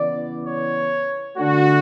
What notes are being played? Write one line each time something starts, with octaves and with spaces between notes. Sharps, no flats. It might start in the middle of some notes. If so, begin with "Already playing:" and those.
Already playing: C#3 E3 B3 E4 D5
C#5
D3 A3 D4 F#4